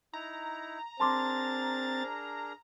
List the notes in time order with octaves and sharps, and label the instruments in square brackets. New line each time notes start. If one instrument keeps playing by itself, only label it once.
[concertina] D#4 E4 [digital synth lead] A#5
[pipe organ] C4 A6 [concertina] D4 G#4 A#4 [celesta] A5 C6 D6